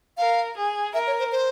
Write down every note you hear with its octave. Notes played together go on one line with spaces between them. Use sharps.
A#4 F5
G#4
A#4 E5
C#5
C5
C5